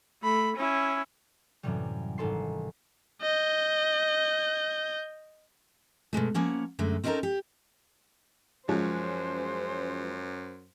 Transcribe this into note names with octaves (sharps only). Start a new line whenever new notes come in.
A3 B5
C#4 E4
F#2 A2 C3 E3 F#3 G3
G#1 G#2 A4 C6 C7
D#5 G6
B2 E3 G#3 A3
F3 A#3 C#4 F#5
F#2 D3 G#3 A3
C4 C#4 D#4 E4 A4 A#4
G4
F#2 F3 G#3 C#4 C5